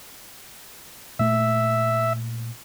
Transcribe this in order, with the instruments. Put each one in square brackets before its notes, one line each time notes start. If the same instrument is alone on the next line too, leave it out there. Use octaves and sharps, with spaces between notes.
[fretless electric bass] A#2 A3 [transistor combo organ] E5